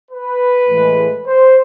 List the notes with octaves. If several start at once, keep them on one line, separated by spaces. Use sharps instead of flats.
B4
A2 E3 G#3
C5